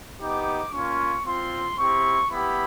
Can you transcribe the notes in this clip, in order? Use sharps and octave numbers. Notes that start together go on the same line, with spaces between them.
B3 D#4 G4 D6
A#3 C#4 F4 C#6
C4 F4 C6
C4 E4 G4 C#6
B3 E4 G4 B5